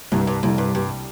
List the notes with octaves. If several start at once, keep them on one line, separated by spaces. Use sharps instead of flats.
C2 G2
G2
C2 F2
G2
G2 G3